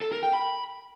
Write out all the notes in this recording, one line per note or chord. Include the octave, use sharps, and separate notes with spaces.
A4
A#4
G5
B5